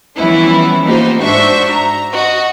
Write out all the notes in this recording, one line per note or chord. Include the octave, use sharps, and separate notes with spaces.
E3 F3 G3 B3 C#4 E4
A#3 B3 D#4 F4 G4 C5
G#2 D4 F#4 C5 E5 C#6
A#5
F#4 D#5